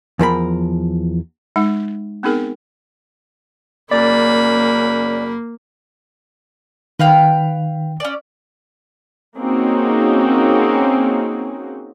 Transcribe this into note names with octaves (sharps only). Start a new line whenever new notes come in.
E2 F3 A#4 B5
G#3 D#4 F#5
B3 C4 D#4 G#4 A#4
F#2 C#3 A#3 D5 B5
D#3 B4 F5 G5
C#4 D5
A#3 C4 C#4 D#4 F#4 G#4